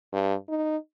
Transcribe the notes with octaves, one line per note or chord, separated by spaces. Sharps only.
G2
D#4